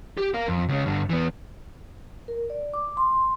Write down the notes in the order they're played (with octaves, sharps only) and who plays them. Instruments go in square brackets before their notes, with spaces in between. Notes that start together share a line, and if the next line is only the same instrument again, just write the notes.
[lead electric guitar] G4
A#4 F5
F2
C#2 C#3
G2 D3
E3 B3
[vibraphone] A#4
D5
D6
C6